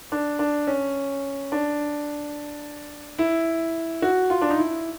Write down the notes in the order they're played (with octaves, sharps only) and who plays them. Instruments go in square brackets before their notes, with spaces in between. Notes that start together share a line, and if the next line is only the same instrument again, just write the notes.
[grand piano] D4
D4
C#4
D4
E4
F#4
F4
D4
D#4
E4